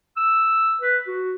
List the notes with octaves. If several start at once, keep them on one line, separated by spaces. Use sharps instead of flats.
E6
B4
F#4